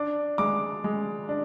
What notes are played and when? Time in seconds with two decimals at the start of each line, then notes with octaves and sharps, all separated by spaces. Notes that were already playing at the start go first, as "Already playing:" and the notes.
Already playing: D4 D6
0.38 G#3 D6
0.84 G#3
1.29 D4